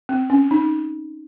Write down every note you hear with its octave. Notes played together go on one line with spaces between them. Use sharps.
C4
C#4
D#4